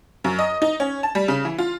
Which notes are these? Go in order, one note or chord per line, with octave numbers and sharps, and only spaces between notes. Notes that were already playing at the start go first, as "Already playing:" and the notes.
F#2
D#5
D#4
C#4
A5
G3
C#3
E3
F4